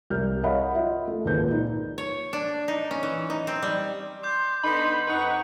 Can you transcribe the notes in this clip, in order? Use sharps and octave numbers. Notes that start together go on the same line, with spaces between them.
C2 A#4 F6 G6
A#4 C#5 D#5 F5 F#5 B5
F4 D#5 E5
A3
G#1 C#2 A#2 A#4 B4 G6
D#4
C#5
D4
D#4
C#4
E3
D#4
C4
G3
C6 D6 G6
D3 B3 D#4 B5 C6
F2 D#4 B4 F#5 C#6